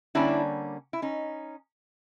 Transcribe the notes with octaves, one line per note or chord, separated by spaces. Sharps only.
D3 G3 A#3 C#4 D4 E4
E4
C#4 D#4